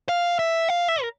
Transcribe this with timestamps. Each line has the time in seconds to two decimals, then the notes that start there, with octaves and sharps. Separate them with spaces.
0.09 F5
0.39 E5
0.69 F5
0.88 E5
1.02 A#4